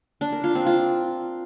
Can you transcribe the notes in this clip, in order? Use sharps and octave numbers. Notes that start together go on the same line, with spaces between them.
D4
A#4
F4
C4
F4